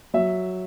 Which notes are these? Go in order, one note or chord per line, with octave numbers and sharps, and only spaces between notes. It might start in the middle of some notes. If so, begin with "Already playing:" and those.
F#3 E5